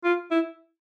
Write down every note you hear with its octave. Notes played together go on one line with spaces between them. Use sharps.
F4
E4